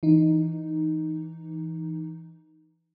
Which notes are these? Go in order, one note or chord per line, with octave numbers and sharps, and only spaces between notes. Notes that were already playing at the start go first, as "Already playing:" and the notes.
E3 D#4